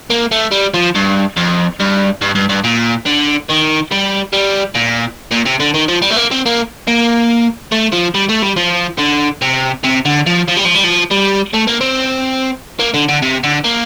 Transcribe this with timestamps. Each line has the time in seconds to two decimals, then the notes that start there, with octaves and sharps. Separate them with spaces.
0.10 A#3
0.32 A3
0.52 G3
0.74 F3
0.95 G2
1.36 F2
1.80 G2
2.21 G2
2.35 G2
2.49 G2
2.64 A#2
3.06 D3
3.49 D#3
3.91 G3
4.33 G3
4.75 A#2
5.32 A#2
5.46 C3
5.60 D3
5.74 D#3
5.88 F3
6.02 G3
6.11 A3
6.16 A#3
6.31 C4
6.46 A#3
6.87 A#3
7.72 A3
7.93 F3
8.14 G3
8.29 A3
8.42 G3
8.56 F3
8.99 D3
9.42 C3
9.84 C3
10.05 D3
10.26 F3
10.48 F3
10.56 G3
10.65 F3
10.74 G3
10.84 F3
11.11 G3
11.53 A3
11.67 A#3
11.81 C4
12.79 A#3
12.94 D3
13.09 D3
13.22 C3
13.44 D3
13.64 A#3